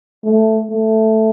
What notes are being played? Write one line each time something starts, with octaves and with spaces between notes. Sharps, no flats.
A3
A3